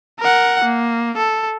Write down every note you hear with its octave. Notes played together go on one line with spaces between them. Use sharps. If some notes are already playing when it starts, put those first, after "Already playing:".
A#4 F#5
A#3
A4